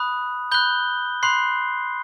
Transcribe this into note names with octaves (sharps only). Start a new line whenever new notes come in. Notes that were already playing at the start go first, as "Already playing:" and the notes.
Already playing: B5 D#6 F#6
B5 F#6 G6 G7
B5 C6 F#6 C7